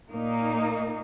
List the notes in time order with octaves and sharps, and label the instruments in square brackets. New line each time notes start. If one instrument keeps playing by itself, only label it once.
[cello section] A#2 A#3 D#4